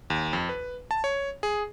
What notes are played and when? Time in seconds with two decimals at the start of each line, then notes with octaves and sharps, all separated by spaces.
0.10 D#2
0.33 F2
0.49 B4
0.91 A5
1.04 C#5
1.43 G#4